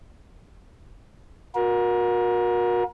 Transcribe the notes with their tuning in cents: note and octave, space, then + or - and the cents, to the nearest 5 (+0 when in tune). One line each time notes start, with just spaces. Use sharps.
F#4 -35 A#4 +25